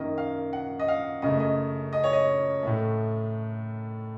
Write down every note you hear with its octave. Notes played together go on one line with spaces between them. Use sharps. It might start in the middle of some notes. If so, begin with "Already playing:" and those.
Already playing: F#2 D#3 A#3 D#5
F5
F#5
D#5
F5
F#2 C#3 A3 D#5
D#5
D#5
C#5
D#5
A2 A3